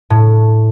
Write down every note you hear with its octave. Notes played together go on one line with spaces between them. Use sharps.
A2